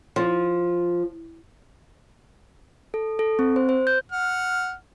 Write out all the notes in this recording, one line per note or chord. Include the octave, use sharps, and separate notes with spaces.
F3
A4
A4
C4
C5
C5
G6
F#5 F6